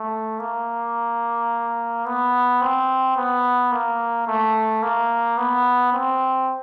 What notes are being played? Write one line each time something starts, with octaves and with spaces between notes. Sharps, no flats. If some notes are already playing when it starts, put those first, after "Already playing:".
Already playing: A3
A#3
B3
C4
B3
A#3
A3
A#3
B3
C4